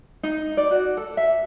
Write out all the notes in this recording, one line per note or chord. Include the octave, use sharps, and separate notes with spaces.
D#4
D5
F#4
A4
E5